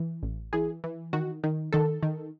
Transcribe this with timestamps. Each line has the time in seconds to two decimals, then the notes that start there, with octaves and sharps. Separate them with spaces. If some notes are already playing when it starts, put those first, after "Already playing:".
Already playing: E3
0.23 A1
0.53 E3 G#4
0.84 E3
1.13 D#3 F#4
1.44 D#3
1.73 D#3 A4
2.03 D#3